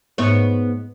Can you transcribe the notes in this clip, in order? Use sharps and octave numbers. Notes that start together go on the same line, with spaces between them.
G#2 B3 C#5